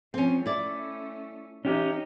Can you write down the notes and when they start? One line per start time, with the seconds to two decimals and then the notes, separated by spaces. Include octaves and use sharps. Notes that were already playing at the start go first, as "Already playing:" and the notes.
0.14 F3 C4 C#4
0.46 A3 C#4 E4 D5
1.65 C#4 D#4 G4